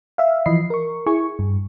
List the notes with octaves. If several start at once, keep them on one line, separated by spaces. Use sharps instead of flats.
E5 F5
E3 F3 D#5 B5 C7
A#4 C#6
E4 G#4 G#5 C#6
G2